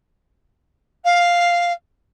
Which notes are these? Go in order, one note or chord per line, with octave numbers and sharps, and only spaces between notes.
F5